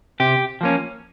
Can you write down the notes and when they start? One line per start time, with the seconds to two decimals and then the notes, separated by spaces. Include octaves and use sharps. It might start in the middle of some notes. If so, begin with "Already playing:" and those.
0.20 C3 G4
0.61 F3 A#3 C#4